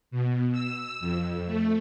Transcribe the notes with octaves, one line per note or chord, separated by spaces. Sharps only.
B2
E6
F2
A3